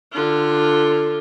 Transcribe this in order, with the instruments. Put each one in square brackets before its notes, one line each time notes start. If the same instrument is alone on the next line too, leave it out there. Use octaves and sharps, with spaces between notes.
[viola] D3 F4